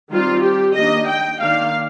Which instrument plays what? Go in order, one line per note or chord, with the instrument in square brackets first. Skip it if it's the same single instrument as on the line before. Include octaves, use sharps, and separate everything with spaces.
[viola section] D#3 G3 C4 F4
G4
D#3 A#3 D4 D#5
G5
D#3 A#3 D4 F5